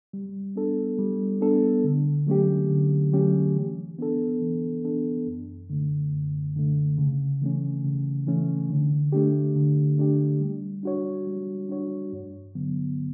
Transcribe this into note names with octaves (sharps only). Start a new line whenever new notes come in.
G3
B3 D4 A4
G3
B3 D4 A4
D3
F#3 A3 C#4 G4
D3
F#3 A3 C#4 G4
E3
B3 D4 A4
E3
B3 D4 A4
F#2
D3 A3
F#2
D3 A3
C#3
E3 A3 C#4
C#3
E3 A3 C#4
D3
A3 D4 G4
D3
A3 D4 G4
G3
D4 F#4 C#5
G3
D4 F#4 C#5
G2
D3 F#3 B3